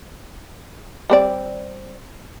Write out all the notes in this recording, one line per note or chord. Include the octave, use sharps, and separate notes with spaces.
G3 C4 D5